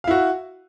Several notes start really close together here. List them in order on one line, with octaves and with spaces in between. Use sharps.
F5 E4 F#4